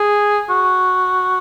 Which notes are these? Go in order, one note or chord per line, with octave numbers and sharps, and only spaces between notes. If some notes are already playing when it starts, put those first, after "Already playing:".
Already playing: G#4
F#4